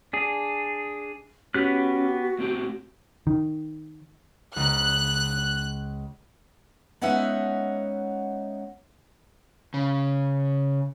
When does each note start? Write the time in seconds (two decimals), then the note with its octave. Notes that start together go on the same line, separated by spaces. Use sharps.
0.13 D4 G#4
1.54 B3 C#4 F#4 G4 F#6
2.39 A2 C4 G4
3.27 D#3
4.56 C#2 A#5 F#6
7.01 G#3 B3 C#4 D#4 E5 F#5
9.74 C#3